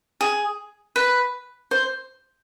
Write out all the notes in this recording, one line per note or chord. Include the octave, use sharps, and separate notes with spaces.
G#4
B4
C5